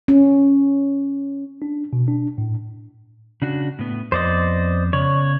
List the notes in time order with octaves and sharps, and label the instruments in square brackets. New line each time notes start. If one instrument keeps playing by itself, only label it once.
[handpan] C#4
[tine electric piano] D4
B2
D4
A2
[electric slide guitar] C#3 D4 F#4
A2 B3
[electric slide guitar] F2 B3 [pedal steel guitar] C5 D5 D#5
[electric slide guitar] C#3 B3 D5 [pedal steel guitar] C#5